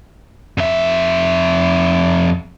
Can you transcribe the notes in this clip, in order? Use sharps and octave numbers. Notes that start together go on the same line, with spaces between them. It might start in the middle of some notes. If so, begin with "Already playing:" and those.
F2 E5